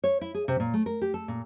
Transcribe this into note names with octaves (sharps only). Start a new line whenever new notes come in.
C#5
E4
G#4
C3
A#2
A3
A#4
G4
A4
A#2